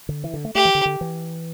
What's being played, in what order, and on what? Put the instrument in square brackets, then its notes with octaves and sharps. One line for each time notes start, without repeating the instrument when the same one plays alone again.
[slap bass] D3
E3
D3
A3
[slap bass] A3 [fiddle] G4
[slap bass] E3
D3
D3
E3